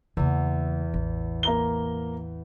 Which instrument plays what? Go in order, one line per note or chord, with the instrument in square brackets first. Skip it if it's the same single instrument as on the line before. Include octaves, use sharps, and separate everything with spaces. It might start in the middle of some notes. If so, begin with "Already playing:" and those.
[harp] E2 [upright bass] C#3 A#3
[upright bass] A1
[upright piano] A#3 A#5 G7